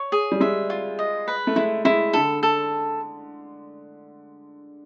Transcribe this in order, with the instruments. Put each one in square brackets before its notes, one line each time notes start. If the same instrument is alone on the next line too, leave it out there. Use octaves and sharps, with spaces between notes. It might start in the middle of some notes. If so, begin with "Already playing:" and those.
Already playing: [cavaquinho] C#5
G#4
[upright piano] G3
[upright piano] G#3 [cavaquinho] E5
[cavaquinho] F4
D#5
B4
[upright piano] A3
[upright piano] G#3 [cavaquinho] E4
[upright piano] G#3 [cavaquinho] E4
[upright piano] D3 [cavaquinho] A4
[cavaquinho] A4